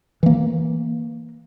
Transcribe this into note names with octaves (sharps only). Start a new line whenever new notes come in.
E3 A#3